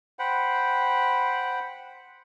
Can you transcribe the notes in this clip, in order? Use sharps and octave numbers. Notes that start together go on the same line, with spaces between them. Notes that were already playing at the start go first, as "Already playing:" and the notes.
C5 F#5 G5 B5